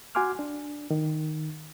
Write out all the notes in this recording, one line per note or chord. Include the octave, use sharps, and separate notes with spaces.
F#4 F#5 G#5 C6 D6 F6
D4
D#3